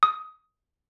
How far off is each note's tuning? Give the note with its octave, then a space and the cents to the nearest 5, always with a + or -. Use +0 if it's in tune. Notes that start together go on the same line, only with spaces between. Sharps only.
D#6 +15